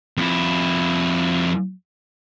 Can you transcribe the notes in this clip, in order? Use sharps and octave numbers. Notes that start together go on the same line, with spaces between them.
F2 E4